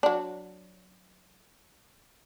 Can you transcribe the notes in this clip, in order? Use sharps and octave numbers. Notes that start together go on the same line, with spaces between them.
F#3 D4